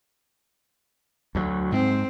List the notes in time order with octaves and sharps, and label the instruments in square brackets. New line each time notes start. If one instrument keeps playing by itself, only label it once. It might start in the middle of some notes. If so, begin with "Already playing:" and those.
[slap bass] D2 F#3
[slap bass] G#2 [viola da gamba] C4